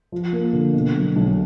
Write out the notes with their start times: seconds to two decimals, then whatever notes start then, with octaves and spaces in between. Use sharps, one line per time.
0.12 F3
0.33 A#3
0.53 D3
0.73 B2
0.94 F#3
1.16 B1